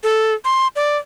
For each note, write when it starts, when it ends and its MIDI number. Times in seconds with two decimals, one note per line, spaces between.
0.03 0.34 69
0.45 0.68 84
0.76 0.98 74